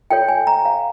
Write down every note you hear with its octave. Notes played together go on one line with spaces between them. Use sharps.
F4 A4 C#5 G5
G#5
A#5
F5